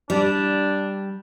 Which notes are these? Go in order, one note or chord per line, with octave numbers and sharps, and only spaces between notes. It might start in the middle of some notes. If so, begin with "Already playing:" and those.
G3 D4